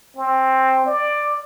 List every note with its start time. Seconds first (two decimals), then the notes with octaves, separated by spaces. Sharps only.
0.17 C4
0.86 D5